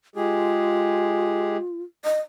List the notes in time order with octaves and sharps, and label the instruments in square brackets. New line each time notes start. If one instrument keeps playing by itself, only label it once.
[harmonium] G#3 G4 G#4 [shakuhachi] F4
[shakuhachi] D#5